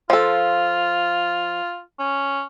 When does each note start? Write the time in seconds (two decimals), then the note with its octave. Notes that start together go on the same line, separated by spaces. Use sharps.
0.10 F3 F4 A4
2.00 C#4